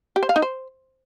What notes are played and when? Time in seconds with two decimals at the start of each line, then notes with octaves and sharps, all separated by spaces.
0.16 G4
0.23 C5
0.29 F5
0.36 D#4
0.42 C5